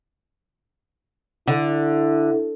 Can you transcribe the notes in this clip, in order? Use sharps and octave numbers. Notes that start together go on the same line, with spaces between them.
D3 E4